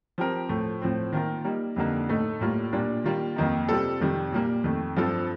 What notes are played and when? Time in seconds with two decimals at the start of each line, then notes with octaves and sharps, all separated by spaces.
0.18 F3 C4 G4 A#4
0.49 A2 F3 A3
0.82 A2 F3 A3 C4
1.13 D#3 A#3 F4 A#4
1.44 G3 A#3 D#4
1.76 F2 D3 G3 A#3 D#4
2.09 A2 A3 D#4 A4
2.41 A2 G3 A#3 F4
2.73 A#2 G3 A#3 D4 F4
3.04 D#3 G3 A#3 F4
3.36 F2 D#3 A#3 D#4
3.69 C3 G3 C4 F4 A4
4.00 F2 C3 D#3 G3
4.32 A#2 G3 A#3
4.64 F2 D#3 A3
4.96 G2 F3 C4 F4 A4